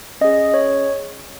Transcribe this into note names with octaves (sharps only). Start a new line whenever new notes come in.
C#4 G#4 D#5
C#5